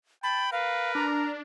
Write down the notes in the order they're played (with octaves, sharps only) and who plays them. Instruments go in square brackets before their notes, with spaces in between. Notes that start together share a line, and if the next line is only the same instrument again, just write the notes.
[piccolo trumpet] G5 [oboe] A5 [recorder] B5
[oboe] A#4 [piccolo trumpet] B4 [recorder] F5
[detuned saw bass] D4 [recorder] A#5